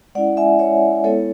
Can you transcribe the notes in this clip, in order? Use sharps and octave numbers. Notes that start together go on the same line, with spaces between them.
G#3 C#4 E4 D5 F#5
E5 G#5
C#5 E5
G#3 B3 E4 A4 C#5